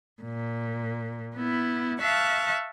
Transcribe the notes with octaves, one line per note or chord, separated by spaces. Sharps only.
A#2
B3 E4
E5 F5 A5 C#6 F#6